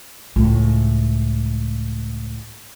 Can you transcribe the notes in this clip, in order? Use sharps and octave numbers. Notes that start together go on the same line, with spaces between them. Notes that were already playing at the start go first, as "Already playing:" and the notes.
C#2 A2